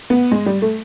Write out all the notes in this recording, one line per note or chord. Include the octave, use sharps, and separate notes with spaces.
B3
G#3
G3
A3